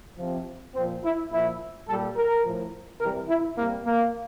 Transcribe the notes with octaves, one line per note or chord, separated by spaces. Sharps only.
C3 F3
A#2 F3 C4
E4
A#2 F3 E4
A#2 G3 A4
A#4
A2 F3
C3 E3 G3 A#4
E4
C3 G3 A#3
A#3